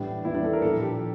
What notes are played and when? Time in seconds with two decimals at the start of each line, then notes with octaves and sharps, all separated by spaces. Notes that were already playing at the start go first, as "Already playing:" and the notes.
Already playing: A2 E3 G3 D4
0.25 A2 E3 G3 E4
0.35 D4
0.44 A4
0.53 A#4
0.62 A#2 F3 A4
0.81 G4
1.00 F3